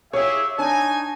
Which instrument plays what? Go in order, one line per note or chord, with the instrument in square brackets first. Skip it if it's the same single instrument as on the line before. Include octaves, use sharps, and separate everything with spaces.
[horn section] E4 G4 G#4 [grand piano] C#5 [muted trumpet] E5 [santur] F5
[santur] D4 [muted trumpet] D#4 [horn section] G#5